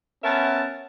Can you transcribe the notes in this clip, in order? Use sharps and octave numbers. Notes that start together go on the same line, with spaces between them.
B3 C#4 A#4 E5 A5